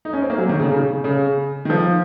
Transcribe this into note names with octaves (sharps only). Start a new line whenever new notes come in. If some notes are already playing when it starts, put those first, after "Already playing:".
D#4
C#4
C4
A#3
F#3
D#3
C#3
C#3
C#3
D#3
F3